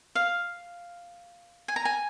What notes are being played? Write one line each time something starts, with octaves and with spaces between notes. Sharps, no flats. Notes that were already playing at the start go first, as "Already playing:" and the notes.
F5
G#5
A#5
G#5